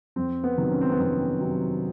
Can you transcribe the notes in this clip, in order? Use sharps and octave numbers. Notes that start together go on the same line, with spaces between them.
F2 C4
B3
C3 D#3 F#3
C#4
C4
B3
F2 C4
C3 D#3 F#3